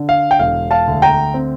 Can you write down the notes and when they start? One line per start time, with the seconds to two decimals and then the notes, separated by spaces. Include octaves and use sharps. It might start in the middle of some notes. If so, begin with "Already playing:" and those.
Already playing: D3
0.09 F5
0.31 G5
0.39 E1 F5
0.71 F5 A5
0.87 D2
1.02 G5 A#5
1.34 C4